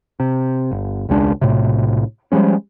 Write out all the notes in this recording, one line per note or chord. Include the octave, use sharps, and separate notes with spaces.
C3
G1
E1 C#2 G#3 D4
B1 A2 C3
F3 G3 G#3 C#4